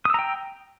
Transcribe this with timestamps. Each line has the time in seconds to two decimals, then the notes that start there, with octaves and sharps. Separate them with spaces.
0.05 D#6
0.10 E6
0.14 A#5
0.19 G5